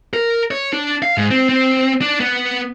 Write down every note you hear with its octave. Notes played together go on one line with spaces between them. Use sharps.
A#4
C#5
D4
F5
G#2
C4
C4
D4
B3